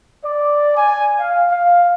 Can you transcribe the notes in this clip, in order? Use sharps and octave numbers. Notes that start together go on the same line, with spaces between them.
D5
G#5
F5
F5